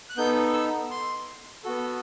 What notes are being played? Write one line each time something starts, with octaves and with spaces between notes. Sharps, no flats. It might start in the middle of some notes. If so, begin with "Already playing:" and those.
F#6
B3 D#4 A4 G6
E6
C6
B3 F#4 A4